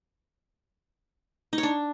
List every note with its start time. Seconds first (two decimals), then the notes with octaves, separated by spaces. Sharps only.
1.53 D#4
1.58 C#5
1.63 D4